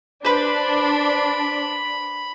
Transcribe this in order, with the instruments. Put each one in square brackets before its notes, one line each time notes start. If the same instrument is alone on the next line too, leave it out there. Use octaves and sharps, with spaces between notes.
[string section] D4 [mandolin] B4 C5 [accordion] B5